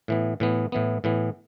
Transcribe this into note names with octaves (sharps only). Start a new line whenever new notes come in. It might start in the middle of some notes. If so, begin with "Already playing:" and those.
A2 E3 B3
A2 E3 B3
A2 E3 B3
A2 E3 B3